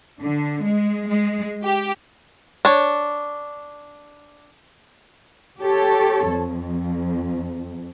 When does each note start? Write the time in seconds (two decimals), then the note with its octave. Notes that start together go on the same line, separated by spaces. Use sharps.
0.21 D3
0.65 G#3
1.08 G#3
1.64 G4
2.65 D4 C#5
5.59 G4 A4 C#5
6.29 F2